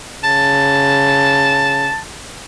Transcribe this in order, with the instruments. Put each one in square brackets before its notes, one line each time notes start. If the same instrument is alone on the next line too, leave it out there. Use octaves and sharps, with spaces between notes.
[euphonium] C#3 [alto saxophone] A5